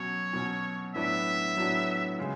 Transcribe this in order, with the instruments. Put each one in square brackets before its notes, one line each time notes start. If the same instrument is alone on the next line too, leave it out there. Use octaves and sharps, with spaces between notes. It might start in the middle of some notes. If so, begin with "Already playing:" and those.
Already playing: [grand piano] B2 F#3 C#4 [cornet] C#5
[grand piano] B2 F#3 C#4
[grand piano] A2 F#3 B3 D4 F#4 [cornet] E5
[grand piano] A2 F#3 B3 D4 F#4
C#3 G#3